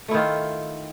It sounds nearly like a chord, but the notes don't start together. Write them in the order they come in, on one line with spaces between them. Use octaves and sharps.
A3 E4 D#3 F4